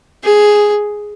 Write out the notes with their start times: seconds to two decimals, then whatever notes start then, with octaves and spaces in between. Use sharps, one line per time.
0.24 G#4